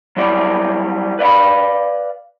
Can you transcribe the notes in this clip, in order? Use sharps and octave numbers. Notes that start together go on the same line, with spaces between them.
F#3 G3 E4 D5
B4 D5 F5 B5